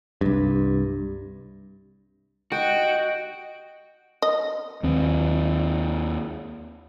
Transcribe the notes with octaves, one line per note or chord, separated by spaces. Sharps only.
C2 G2
F#4 D#5 G5 D7
D#5
D#2 C4